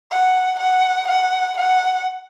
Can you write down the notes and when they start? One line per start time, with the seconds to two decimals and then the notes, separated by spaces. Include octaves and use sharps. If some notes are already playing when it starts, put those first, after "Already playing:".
0.11 F#5
0.59 F#5
1.08 F#5
1.57 F#5